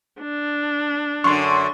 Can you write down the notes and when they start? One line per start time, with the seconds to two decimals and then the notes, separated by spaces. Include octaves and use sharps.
0.21 D4
1.24 F#2 D3 C6 C#6